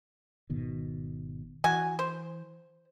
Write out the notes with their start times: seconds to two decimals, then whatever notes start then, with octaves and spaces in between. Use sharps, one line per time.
0.50 G#1 B2 D#3
1.64 E3 F#4 G#5
1.99 C5